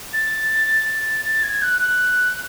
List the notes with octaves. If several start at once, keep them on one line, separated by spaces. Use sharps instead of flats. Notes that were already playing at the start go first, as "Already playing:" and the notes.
A6
A6
G#6
F#6
F#6